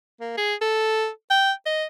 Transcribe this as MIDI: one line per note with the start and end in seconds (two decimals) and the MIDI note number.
0.20 0.36 58
0.38 0.55 68
0.61 1.08 69
1.30 1.52 79
1.66 1.85 75